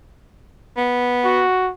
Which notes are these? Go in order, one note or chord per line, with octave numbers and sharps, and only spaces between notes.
B3
F#4